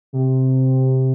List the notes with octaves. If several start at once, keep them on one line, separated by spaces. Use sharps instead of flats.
C3